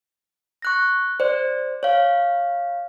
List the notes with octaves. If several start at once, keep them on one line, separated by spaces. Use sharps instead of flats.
C#6 F#6 A#6
C5 D5
C#5 F5